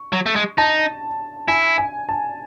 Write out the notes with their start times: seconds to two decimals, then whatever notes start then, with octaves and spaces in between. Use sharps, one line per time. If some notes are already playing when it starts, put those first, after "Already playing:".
Already playing: C#6
0.13 F#3
0.26 A3
0.36 G#3
0.58 D#4 A5
1.48 E4 G#5
1.78 G#5
2.09 A5